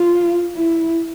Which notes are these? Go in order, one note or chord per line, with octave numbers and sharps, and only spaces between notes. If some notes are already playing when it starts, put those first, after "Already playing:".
Already playing: F4
E4